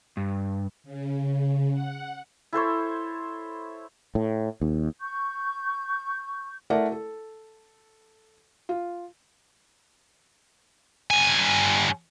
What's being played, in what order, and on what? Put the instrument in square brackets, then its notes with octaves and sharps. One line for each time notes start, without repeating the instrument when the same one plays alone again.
[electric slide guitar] G2
[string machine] C#3
F#5
[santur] E4 A4 C5 C#5
[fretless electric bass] A2
D#2
[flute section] C#6 G6
[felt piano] A3 E4 A#4 D5 F#5
A4
F4
[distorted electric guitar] G2 G#5